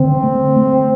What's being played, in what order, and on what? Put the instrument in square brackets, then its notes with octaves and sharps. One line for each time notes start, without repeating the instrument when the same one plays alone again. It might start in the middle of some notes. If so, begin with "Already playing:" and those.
Already playing: [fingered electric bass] D3 [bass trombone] C4
[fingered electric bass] A3
A3